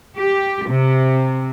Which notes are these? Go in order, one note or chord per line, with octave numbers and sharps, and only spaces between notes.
G4
C3